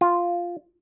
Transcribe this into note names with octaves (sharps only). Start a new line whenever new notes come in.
F4